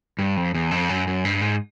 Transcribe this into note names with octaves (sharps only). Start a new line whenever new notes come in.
G2
F2
E2
F2
F#2
F#2
G2
G#2